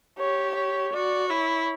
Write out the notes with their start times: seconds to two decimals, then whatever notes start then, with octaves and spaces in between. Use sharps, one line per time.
0.18 G4 C#5
0.55 C#5
0.93 F#4 D5
1.30 E4 C#5